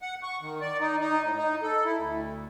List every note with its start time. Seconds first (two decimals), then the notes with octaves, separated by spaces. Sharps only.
0.02 F#5
0.23 C#6
0.41 D#3
0.61 D5
0.81 D#4
1.00 D#4
1.22 A2
1.36 D#4
1.62 A4
1.85 E4
1.97 D2